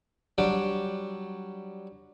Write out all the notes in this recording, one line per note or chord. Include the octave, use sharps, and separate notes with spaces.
F#3 G3 D4 G4